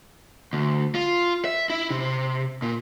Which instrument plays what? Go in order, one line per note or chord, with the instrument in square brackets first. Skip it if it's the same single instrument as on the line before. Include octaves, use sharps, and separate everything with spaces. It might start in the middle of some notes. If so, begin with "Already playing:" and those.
[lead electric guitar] D2
F4
E5
E4
C3
A#2